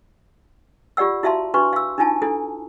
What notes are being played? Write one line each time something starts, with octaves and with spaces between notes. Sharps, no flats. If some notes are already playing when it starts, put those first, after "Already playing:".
F4 G4 D5 F#5 E6
E4 F#4 E5 F5 A5 C6
D4 F#4 B4 C6 C#6
F5 E6
D4 D#4 F4 G#5 A5
D4 E4 A4